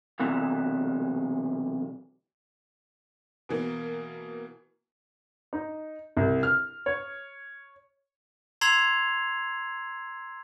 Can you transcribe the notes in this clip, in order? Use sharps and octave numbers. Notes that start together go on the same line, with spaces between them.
B1 C3 E3
B2 E3 A#3
D#4
C2
F6
C#5
A#5 C6 E6 G#6 C7 F7